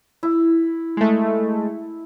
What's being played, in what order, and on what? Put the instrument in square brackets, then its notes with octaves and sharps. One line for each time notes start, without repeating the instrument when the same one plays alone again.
[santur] E4
[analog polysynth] G#3 A3